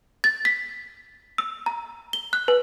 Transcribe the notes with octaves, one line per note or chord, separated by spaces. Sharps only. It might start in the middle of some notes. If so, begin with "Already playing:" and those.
A6
B6
E6
A#5
G7
F#6
B4